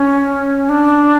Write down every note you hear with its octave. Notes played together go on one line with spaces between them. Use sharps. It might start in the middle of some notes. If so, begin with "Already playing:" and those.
Already playing: C#4
D4